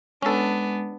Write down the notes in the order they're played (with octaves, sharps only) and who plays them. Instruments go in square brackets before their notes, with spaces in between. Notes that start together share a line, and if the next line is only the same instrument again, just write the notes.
[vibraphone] G#3 [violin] B3 D4 [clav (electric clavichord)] C#4 A4